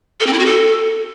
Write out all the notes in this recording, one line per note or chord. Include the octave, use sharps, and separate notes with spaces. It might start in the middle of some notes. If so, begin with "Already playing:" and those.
A4
C4
E4
F#4
A4